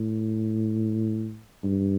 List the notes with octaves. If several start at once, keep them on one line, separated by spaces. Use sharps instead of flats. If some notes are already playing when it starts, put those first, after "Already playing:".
Already playing: A2
G2